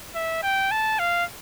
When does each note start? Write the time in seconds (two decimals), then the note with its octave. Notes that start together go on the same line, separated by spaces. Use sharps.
0.15 E5
0.43 G5
0.71 A5
0.99 F5